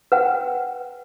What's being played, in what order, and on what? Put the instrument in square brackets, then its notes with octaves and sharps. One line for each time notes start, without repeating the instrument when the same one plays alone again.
[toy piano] B4 F#5 G5